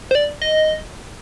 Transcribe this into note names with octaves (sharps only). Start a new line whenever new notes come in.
C5
D5
D#5